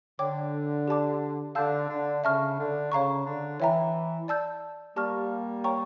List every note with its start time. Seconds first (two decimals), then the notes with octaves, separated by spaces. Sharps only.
0.19 D3 C#5 G5 D6
0.88 G4 D5 A5 D6
1.55 D3 F5 A5 E6 G6
1.89 D3
2.24 C#3 E5 A5 C#6 F6
2.58 D3
2.91 C#3 C#5 F5 A#5 C#6
3.26 D3
3.60 E3 C#5 E5 G5 A#5
4.28 D5 A5 E6 G6
4.96 G3 A#3 G4 D5 A5 C#6 F6
5.64 C#5 G5 A#5 C#6